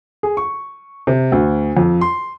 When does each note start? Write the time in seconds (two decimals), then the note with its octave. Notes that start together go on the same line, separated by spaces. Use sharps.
0.23 G#4
0.37 C#6
1.07 C3
1.32 D2
1.77 F2
2.01 C6